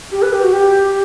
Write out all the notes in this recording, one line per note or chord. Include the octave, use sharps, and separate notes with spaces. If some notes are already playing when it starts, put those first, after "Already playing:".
G4
B4
G4
F#4
G4